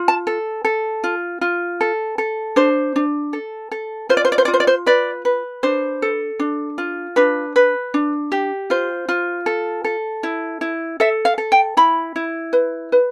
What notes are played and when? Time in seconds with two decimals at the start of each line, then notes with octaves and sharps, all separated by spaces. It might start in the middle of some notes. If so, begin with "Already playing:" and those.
Already playing: F4
0.08 A5
0.27 A4
0.65 A4
1.04 F4
1.41 F4
1.81 A4
2.18 A4
2.56 D4 C5
2.96 D4
3.33 A4
3.72 A4
4.09 F4 C5
4.17 D5
4.25 C5
4.32 D5
4.38 C5
4.45 D5
4.48 F4
4.54 C5
4.60 D5
4.67 C5
4.86 B4 D5
5.25 B4
5.63 D4 C5
6.02 A4
6.39 D4
6.78 F4
7.16 D4 B4
7.56 B4
7.94 D4
8.32 G4
8.70 F4 C5
9.09 F4
9.46 A4
9.84 A4
10.23 E4
10.61 E4
11.00 A4 E5
11.25 F5
11.38 A4
11.52 G5
11.77 E4 B5
12.16 E4
12.53 B4
12.92 B4